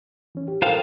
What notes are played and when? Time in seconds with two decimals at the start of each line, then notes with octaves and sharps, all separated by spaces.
0.35 E3 C#4
0.48 G4
0.62 F4 A4 A#4 C5 F5 G5